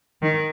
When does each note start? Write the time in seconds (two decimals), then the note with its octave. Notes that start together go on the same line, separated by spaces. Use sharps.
0.22 D#3